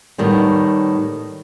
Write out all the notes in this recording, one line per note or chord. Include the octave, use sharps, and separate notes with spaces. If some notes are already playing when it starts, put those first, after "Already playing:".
A2 D#3 G3 B3